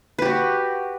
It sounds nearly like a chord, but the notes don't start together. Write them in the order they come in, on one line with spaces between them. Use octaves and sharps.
B4 G4 F#4